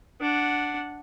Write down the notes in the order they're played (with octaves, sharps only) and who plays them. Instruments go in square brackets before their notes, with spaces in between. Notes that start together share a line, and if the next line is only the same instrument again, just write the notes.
[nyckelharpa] D4 F#5